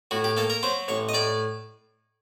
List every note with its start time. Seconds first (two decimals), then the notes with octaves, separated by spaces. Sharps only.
0.11 A2 F#4
0.24 G4
0.37 A#3 A4
0.50 A#4
0.63 F#3 C5
0.88 A1 C#5
1.09 D#5
1.14 A2 D5